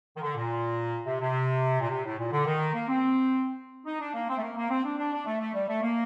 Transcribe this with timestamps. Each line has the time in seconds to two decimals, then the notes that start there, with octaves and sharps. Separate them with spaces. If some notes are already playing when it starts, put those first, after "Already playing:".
0.16 D#3
0.22 D3
0.36 A#2
1.06 C3
1.20 C3
1.80 A#2
1.89 C3
2.05 A2
2.18 A#2
2.31 D3
2.46 D#3
2.74 A#3
2.88 C4
3.86 D#4
4.00 D4
4.14 A#3
4.29 C4
4.38 A3
4.42 A#3
4.57 A#3
4.70 C4
4.84 D4
4.98 D4
5.13 D4
5.26 A3
5.40 A3
5.54 G3
5.68 A3
5.82 A#3